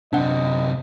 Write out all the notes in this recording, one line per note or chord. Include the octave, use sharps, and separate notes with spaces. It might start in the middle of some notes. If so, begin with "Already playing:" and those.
F#2 C3 D4 D#5 F#5